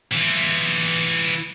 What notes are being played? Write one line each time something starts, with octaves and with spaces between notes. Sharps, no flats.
E3 F4